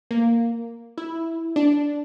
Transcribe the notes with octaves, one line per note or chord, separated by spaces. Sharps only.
A#3
E4
D4